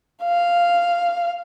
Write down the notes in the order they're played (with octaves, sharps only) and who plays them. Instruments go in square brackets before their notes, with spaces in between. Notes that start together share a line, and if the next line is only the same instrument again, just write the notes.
[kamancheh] F5